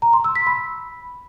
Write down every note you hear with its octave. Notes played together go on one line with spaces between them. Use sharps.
A#5
C6
E6
B6
B5